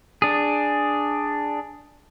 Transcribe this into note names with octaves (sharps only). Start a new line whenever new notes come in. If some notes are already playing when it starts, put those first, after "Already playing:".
D4 G#4